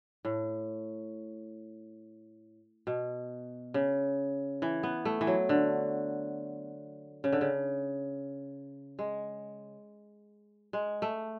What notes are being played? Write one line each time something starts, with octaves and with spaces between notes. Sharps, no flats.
A2
B2
C#3
E3
B3
A3
E3
F#3
D3
C#3
D3
C#3
G#3
G#3
A3